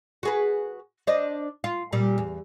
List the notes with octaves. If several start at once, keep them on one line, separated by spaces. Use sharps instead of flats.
F#4 G#4 B4
D4 C5 D#5
F4
A#2 G3
E2